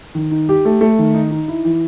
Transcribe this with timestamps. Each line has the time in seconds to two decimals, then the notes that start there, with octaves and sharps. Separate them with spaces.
0.15 D#3
0.31 D#4
0.49 G4
0.65 A3
0.81 A3
0.99 D#3
1.14 D#4
1.31 D#4
1.48 E4
1.65 E3